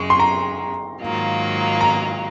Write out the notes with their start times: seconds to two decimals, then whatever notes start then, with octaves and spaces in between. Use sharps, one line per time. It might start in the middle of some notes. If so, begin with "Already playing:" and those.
Already playing: F#2 C#3 G#3 C#6
0.10 C6
0.20 A#5
1.00 G#2 D#3 F#3 A#3 F4
1.81 A#5